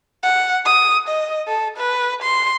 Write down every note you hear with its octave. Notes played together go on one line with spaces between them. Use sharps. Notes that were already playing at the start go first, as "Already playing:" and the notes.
F#5
D#6
D#5
A4
B4
C6